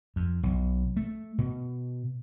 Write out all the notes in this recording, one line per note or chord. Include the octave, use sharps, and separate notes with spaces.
F2
B1
A3
B2